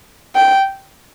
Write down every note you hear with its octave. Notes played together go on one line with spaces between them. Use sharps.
G5